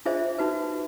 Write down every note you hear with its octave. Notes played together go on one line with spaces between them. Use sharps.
D4 F4 G#4 C5 E5
D#4 F#4 B4